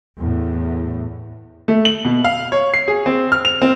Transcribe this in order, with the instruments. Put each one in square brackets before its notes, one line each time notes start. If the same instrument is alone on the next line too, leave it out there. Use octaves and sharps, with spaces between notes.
[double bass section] E2 A2
[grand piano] A3
F#7
B2
F5
C#5
C7
G#4
C4
F6
F7
C4